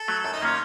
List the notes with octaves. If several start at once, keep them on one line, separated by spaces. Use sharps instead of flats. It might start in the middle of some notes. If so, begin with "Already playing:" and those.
Already playing: A4
F#3 A3
F#2
D#4
D#3 A#3 C#4 F4